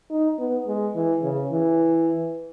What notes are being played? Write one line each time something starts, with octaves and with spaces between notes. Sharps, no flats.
D#4
B3
G#3
E3
C#3
E3